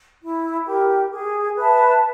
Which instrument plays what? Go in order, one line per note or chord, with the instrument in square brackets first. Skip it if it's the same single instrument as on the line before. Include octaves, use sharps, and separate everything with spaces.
[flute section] E4
G4 A#4
G#4
B4 E5 A5